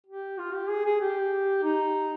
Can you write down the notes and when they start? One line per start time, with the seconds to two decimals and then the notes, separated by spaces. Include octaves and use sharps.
0.06 G4
0.38 F4
0.54 G4
0.69 G#4
0.85 G#4
1.00 G4
1.63 D#4